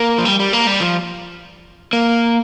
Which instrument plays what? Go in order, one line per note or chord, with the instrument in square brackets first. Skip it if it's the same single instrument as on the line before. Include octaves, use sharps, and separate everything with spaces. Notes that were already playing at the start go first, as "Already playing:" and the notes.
Already playing: [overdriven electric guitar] A#3
F3
G3
G3
A#3
G3
F3
A#3